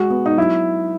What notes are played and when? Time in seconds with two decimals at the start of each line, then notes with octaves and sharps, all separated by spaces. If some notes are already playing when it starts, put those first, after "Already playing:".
Already playing: G#3 F#4
0.10 B3
0.26 D#4
0.38 F#3 E4